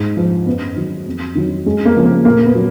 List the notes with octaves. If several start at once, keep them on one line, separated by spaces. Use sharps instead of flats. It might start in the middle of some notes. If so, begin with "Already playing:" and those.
Already playing: G#2
F3
F#2 B3
D#3 F#3
F2
D#3 F#3
F#2 G#3
A#3
C#3 F3
A#3
A#2 A#3
B3
F#3